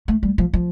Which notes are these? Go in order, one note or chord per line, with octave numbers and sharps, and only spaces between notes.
A3
G3
F3
F3